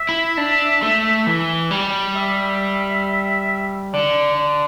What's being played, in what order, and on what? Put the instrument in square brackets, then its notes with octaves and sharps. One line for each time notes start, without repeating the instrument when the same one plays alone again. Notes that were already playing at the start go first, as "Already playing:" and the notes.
Already playing: [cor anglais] E5
[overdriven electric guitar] E4
D4
A3
E3
G3
[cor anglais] E5
[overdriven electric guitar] D3 [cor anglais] D5
[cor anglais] D5